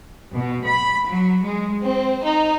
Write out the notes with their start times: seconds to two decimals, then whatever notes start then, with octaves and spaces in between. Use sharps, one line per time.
0.32 B2
0.65 B5
1.05 F#3
1.43 G#3
1.83 C4
2.23 D#4